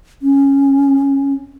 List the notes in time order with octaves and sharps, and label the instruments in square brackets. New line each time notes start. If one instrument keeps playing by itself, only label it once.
[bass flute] C#4